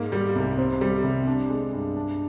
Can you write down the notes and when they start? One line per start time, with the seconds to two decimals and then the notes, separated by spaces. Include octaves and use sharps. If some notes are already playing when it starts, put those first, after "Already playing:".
Already playing: G#2 A#3
0.12 G3
0.35 C2
0.58 C4
0.81 G3
1.04 C3
1.27 D4
1.50 G#3
1.73 G2
1.96 D4